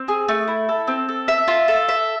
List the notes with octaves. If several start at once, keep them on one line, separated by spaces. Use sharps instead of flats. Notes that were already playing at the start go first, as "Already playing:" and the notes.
Already playing: C4
G#4
A3
E4
A4
C4
A4
E5
F4
A4
E5